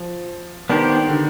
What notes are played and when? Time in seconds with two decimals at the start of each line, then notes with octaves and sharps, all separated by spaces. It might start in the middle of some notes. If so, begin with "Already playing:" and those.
Already playing: F3
0.70 D#3 B3 D4 G4 C5
1.09 D3